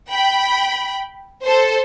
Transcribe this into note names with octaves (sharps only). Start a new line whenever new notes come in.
G5 B5
A4 C5